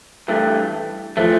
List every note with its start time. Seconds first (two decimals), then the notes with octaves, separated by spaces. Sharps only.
0.28 G2 E3 A3
1.17 E3 F3 A3